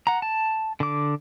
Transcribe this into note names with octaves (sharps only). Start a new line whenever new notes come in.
F#5 A#5
A5
D3 D6